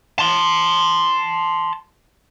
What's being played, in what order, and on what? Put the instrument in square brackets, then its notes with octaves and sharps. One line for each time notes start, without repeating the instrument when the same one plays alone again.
[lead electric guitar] A5 C6